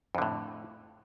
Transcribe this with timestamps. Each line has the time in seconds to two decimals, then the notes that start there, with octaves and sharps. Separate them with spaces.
0.15 F2
0.18 D3
0.22 A2